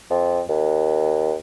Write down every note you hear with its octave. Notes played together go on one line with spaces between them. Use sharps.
F2
D#2